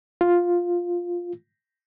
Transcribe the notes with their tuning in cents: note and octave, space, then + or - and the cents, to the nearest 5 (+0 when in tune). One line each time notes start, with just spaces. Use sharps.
F4 +5